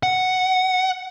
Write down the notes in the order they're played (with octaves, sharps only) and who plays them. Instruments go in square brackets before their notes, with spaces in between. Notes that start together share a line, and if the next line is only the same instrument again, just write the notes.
[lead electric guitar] F#5